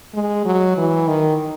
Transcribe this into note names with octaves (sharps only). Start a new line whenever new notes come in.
G#3
F#3
E3
D#3